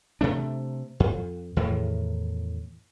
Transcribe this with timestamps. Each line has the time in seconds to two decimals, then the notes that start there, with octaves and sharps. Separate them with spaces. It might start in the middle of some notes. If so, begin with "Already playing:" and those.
0.21 C3 A3 D4
1.00 F2
1.57 E2 A2 D#3